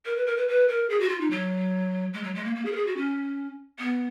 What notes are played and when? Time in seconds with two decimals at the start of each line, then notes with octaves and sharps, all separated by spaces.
0.05 A#4
0.16 B4
0.26 A#4
0.37 B4
0.48 B4
0.68 A#4
0.90 G#4
1.00 F#4
1.09 F4
1.20 D#4
1.30 F#3
2.13 G#3
2.23 F#3
2.35 G#3
2.44 A#3
2.55 A#3
2.65 G#4
2.72 A#4
2.76 G#4
2.86 F#4
2.97 C#4
3.79 B3